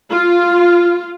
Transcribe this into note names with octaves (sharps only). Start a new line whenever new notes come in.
F4